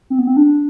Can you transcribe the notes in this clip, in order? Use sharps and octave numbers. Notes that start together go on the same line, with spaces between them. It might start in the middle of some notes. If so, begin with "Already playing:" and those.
C4
B3
C4
D4